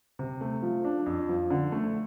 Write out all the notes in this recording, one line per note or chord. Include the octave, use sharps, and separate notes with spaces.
C3
A3
F3
D4
F2
F3
D3
A3